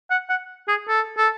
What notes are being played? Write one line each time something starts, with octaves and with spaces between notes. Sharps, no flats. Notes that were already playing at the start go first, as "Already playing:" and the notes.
F#5
F#5
G#4
A4
A4